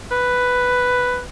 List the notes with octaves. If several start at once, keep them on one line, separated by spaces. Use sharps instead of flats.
B4